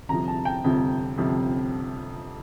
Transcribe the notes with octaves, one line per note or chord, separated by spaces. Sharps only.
G1 F2 C3 F3 A#5
A5
G5
G1 F2 C3 F3
G1 F2 C3 F3